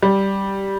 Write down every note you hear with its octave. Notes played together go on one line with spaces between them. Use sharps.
G3